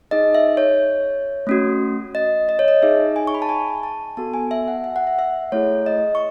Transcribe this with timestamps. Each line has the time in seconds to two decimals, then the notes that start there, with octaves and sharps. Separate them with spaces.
0.11 D#4 G#4 D#5
0.35 E5
0.57 C#5
1.47 A3 C#4 F#4
2.15 D#5
2.49 D#5
2.59 C#5
2.68 D#5
2.82 D#4 G#4 E5
3.16 G#5
3.27 C#6
3.35 B5
3.42 A5
3.49 G#5
3.83 A5
4.17 B3 F#4 A4 A5
4.34 G#5
4.51 E5
4.68 F#5
4.84 E5
4.96 F#5
5.07 E5
5.19 E5
5.52 A3 E4 G#4 C#5
5.86 D#5
6.15 C#6